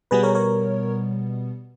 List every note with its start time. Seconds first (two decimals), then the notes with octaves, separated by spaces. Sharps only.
0.11 B2 G3 B3 G#4 B4
0.23 A#4 C#5
0.35 A#4 C#5